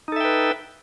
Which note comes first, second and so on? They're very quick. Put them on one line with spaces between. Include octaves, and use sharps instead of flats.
D#4 A4 E5 G5 B4